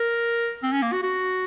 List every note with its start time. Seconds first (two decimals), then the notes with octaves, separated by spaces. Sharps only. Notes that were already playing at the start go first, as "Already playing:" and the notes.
Already playing: A#4
0.63 C4
0.72 C#4
0.82 A#3
0.93 F#4
1.03 F#4